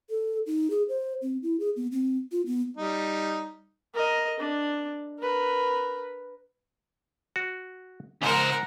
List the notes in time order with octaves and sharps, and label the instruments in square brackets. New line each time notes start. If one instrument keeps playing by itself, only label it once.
[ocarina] A4
D#4
G#4
C5
C4
E4
G#4
B3
C4
F4
B3
[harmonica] G3 D#4
[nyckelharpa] A#4 D#5
D4
A#4 B4
[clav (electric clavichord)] F#4
[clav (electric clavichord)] G#2 [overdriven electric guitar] C#3 C5 [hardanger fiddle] A#4 F#5